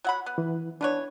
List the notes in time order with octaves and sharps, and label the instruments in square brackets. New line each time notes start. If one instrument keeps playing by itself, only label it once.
[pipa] F#3 F#5 B5
B3
[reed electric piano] E3
[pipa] E3 B3 C#5 [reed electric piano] D4